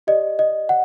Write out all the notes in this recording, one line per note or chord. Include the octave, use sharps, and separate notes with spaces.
G4 D5 D#5
D#5
F#5